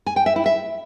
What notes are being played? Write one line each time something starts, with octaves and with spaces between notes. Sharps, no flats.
G#5
G5
E5
E4
E5